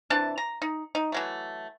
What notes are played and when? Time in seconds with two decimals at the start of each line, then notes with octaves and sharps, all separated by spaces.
0.10 C3 E3 D4 A5
0.38 A#5
0.62 D#4
0.95 D#4
1.12 E3 F#3 A3